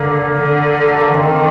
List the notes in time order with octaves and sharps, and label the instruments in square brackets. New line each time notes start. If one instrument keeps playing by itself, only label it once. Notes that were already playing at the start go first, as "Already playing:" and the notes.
Already playing: [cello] D3 [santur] A#3
[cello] D3
[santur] A3
A#3
[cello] D#3 [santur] C4